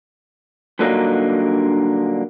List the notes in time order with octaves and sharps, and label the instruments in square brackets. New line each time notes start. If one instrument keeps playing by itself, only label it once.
[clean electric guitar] G2 A#2 D3 F#3 A#3 D#4